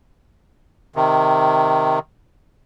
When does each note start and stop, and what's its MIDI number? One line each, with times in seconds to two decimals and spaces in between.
0.96 1.99 48
0.96 1.99 51